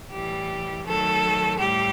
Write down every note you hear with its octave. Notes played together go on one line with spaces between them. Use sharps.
A2 E3 G3 G4
D#3 F#3 A3 A4
A2 G3 G4